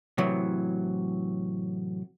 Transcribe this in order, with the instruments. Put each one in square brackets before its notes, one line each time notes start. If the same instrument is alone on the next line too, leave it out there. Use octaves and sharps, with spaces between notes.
[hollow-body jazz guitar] A2 C3 E3 F#3